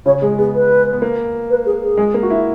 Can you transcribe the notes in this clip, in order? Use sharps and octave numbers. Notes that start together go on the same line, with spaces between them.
C#3 C#5
G#3 G#4
B3 G#4
B4
B3
A#3
B4
G#4
G#4
G#3
A#3
F#4
E4